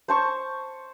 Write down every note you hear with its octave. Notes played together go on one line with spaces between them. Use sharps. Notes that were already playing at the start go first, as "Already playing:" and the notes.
C5 A5 C#6